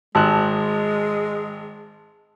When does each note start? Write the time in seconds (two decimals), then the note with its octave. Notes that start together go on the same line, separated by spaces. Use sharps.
0.15 G#1 G#3 A5 C6 F#6 E7